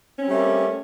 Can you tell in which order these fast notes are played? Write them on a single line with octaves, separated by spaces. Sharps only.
C#4 C4 G3 A3 A#3